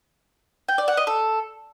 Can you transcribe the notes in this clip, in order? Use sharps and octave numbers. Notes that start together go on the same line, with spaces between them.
G5
D5
F#5
D#5
A4